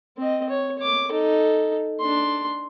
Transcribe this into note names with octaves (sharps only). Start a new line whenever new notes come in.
C4 D#5
C#5
C#5 D6
D#4 A4
D4 C6